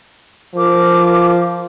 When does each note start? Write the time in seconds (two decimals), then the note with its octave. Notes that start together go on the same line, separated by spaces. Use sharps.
0.55 F3 A#4 D6